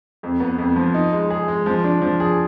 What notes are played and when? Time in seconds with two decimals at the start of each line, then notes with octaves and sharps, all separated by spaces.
0.23 F2
0.40 B3
0.58 F2
0.76 F3
0.94 D#4
1.12 G#3
1.30 G#4
1.48 G#3
1.66 F3
1.84 D4
2.02 F3
2.20 G#4